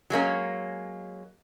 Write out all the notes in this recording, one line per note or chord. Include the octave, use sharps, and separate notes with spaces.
F#3 G#3 A#3 C#4